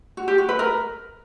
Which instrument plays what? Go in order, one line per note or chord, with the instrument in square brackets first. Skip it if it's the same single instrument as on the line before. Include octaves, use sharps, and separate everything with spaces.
[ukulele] F#4
G4
F#4
B4
A#4